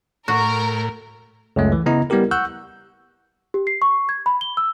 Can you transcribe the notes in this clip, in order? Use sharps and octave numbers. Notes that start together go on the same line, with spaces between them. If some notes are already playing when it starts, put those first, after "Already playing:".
A2 F#4 A#4
C#2 F#2 A3
E3
C#3 B3 E4 D#5 A#5
G3 B3 E4 G4 A#4
F#5 C#6 E6 F#6 G6
G4
C7
C#6
G#6
B5
G7
E6